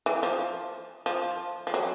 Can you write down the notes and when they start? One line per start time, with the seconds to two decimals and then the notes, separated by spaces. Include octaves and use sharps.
0.06 E3
0.23 F3
1.06 F3
1.67 F3
1.74 F#3